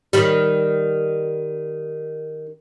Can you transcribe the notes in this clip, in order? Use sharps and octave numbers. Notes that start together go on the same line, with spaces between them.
D#3 G3